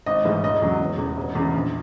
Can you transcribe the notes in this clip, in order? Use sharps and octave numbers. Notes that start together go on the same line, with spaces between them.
G#1 D#5
G#2 E3 G#3
E1 D#5
E2 C#3 F#3
E1
E2 C#3
E1
E2 C#3
A#1